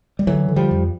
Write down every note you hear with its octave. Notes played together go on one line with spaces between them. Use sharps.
G3
D3 E3 F#3
D3
F3 G3
F2